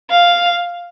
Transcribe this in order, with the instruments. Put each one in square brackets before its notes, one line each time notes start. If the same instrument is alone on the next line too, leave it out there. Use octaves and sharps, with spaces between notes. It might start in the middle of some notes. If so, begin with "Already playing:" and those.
[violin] F5